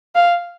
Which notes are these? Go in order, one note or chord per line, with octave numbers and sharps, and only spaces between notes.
F5